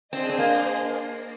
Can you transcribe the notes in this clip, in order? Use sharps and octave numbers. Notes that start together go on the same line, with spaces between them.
C4 D4 G#4 C5 D#5
C4
A#3